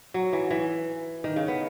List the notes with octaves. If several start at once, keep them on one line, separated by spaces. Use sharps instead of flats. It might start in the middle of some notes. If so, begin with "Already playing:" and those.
F#3
E3
E3
D#3
C#3
B3